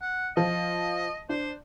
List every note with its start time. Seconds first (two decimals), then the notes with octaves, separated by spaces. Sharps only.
0.01 F#5
0.37 F3 D#5
1.29 D4 C5